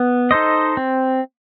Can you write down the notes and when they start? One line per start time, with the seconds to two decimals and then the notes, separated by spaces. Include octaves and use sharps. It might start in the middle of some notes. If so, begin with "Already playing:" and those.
Already playing: B3
0.31 D#4 A4 C5 D#5
0.77 C4